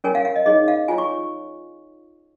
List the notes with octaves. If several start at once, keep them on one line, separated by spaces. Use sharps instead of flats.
C#4 A#4 C#5 G#5
F5
F5
D#5
D#4 G#4 C#5 D#5
F5
F4 C#5 G#5
C#6